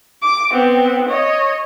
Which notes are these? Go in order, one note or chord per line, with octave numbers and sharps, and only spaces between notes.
D6
B3 C4
C#5 D#5